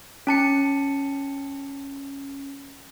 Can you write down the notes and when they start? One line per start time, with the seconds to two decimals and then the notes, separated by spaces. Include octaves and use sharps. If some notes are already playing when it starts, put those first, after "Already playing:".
0.27 C#4 A5 C#7